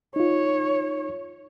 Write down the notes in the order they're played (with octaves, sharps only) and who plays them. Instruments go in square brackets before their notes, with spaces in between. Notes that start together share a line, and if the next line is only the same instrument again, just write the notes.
[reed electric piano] D#4 F4 [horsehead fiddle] C#5